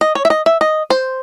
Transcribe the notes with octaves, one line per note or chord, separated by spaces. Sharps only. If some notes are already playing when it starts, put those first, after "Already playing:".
D#5
C#5
E5
D#5
E5
D#5
C5